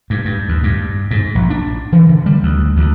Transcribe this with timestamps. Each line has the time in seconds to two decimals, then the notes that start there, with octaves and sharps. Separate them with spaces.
0.10 G2
0.25 G2
0.49 D#2
0.63 G2
1.11 G#2
1.35 A#1
1.50 D4
1.92 E3
2.09 D3
2.26 G3
2.43 D2
2.77 D2